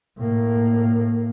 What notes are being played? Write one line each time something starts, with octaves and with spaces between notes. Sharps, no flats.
A2 A#3